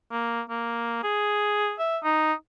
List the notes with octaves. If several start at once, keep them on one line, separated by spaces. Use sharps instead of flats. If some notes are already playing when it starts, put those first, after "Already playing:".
A#3
A#3
G#4
E5
D#4